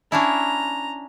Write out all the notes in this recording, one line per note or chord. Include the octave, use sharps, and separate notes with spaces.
C#4 D4 E4 A#5